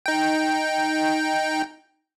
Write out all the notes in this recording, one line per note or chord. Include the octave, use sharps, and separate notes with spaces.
D#4 G5